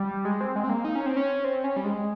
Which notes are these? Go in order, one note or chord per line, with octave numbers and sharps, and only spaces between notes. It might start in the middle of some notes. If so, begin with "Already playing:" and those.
Already playing: G3
G#3
C4
G#3
C4
A#3
D#4
C#4
C4
C#4
C4
C#4
G3
G#3